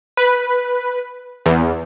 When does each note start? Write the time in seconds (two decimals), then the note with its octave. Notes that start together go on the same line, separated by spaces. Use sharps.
0.17 B4
1.46 E2